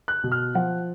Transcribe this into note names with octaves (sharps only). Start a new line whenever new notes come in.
F#6
B2
F6
F3 F#5